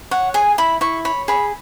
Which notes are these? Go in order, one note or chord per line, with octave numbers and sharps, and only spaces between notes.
C#5 F#5
G#4 G#5
E4 B5
E4 C#6
C#5 B5
G#4 B5